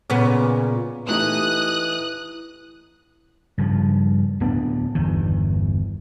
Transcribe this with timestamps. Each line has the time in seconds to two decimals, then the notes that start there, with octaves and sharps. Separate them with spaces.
0.10 A#2 C#3 B3
1.09 E3 A3 D#4 G4 D#6 F#6
3.58 G2 C#3 F3
4.40 D1 B3 D4
4.95 G1 E2 D#3